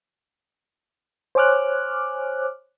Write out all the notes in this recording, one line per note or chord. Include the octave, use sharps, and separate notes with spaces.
C5 C#5 G#5 D6 F6 F#6